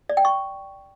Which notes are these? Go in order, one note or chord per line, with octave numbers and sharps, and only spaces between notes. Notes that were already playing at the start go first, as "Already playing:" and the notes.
D5
G5
C#6